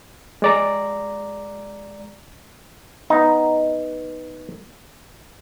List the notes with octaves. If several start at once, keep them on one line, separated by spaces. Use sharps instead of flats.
G#3 D5 A#5
B3 D#4